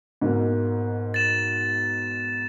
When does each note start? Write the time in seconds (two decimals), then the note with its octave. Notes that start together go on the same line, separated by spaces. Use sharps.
0.21 G#2 B2 A#3
1.14 A6 E7